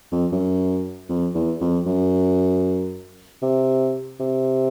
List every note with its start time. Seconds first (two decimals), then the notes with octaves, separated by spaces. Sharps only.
0.12 F2
0.32 F#2
1.09 F2
1.35 E2
1.61 F2
1.86 F#2
3.42 C3
4.20 C3